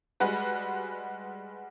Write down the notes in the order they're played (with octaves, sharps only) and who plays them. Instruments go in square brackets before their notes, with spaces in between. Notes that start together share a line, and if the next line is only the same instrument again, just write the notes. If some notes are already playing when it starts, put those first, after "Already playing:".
[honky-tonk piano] G3 G#3 F#4 B4